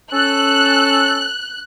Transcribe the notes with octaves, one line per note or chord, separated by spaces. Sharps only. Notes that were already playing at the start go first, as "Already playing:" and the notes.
C#4 A4 F#6